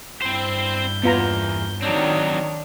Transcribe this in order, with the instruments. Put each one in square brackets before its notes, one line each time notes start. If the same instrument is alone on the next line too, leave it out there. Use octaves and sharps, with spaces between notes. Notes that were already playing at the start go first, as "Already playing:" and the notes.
[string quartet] G2 G6 [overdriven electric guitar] C4 C5 [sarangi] E4
[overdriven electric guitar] E2 [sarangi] A#3 [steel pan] B3 F4 A#5
[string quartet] D#3 D#4 C#5 [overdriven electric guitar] F#3 C4 [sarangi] D4